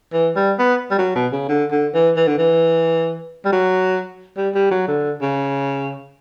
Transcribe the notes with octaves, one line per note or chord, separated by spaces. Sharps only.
E3
G3
B3
G3
F#3
B2
C#3
D3
D3
E3
E3
D3
E3
G3
F#3
G3
G3
F#3
D3
C#3